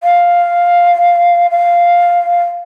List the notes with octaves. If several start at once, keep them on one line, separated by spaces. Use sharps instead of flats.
F5
F5